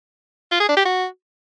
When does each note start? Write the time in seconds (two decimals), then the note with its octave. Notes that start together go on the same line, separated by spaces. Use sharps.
0.52 F4
0.60 G#4
0.69 D4
0.77 G4
0.85 F#4